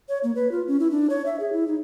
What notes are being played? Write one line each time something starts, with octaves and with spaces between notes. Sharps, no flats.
C#5
A#3
B4
F4
C#4
E4
D4
C#5
E5
G#4
E4
D#4